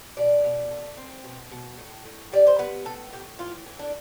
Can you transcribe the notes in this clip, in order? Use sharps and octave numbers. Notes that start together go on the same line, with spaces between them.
B2 D5
B2
A3
C4
B2
B2
A2
A2
G3 D5
C5
B3 B4
A2 A4
A2 G4
E3 F4
E3
D4